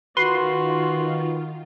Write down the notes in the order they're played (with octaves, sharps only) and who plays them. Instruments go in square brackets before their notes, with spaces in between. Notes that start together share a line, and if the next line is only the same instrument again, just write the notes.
[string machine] D#3 F4 [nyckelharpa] F#4 [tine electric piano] B4 [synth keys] C6